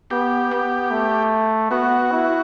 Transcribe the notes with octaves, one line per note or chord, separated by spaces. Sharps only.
B3 G4
B3
A3
B3 F#4
E4